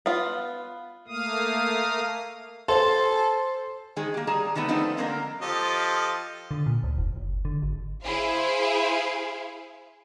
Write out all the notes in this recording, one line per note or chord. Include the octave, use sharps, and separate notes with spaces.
B3 F4
A3 A#3 F5 D#6
A4 C5
D#3 G#3 G#4
A#3 G4
G3 G#4 A5 A#5
D#3 G3 A3 B3
F3 A3 B3 C4 D4 D#4
D3 G#3 A#3 C4 D4 A#4
F3 G4 A4 D#5
D3
A#2
D2
F1
F#1
D3
G#1
E4 G#4 C5 F5